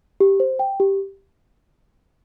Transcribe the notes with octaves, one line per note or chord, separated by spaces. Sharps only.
G4
C5
G5
G4